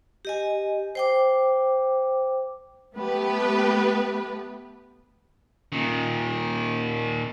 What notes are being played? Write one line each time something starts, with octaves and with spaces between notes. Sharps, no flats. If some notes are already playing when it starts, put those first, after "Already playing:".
G4 D#5 G#5
C5 G5 D6
A3 B3 G4 B4
A#2 D#3